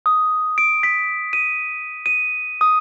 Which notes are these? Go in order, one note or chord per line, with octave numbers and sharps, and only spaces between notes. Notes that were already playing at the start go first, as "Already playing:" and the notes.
D#6
D7
B6
D#7
D#7
D#6